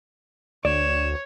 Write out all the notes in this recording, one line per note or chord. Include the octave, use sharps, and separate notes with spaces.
D2 C#5 D5 E7